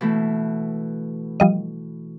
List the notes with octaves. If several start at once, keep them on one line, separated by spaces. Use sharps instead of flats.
B2 E3 A3
F3 G3 D#5